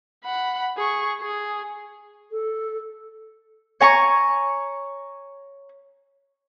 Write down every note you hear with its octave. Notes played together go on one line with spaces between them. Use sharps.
F#5 B5
G#4 C#6
G#4
A4
C#5 G#5 A#5 C#6